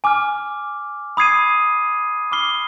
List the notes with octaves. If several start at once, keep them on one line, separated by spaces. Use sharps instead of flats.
G#5 D6 F6
B5 D#6 G#6 C7 D#7
B5 D6 F6 C7 G7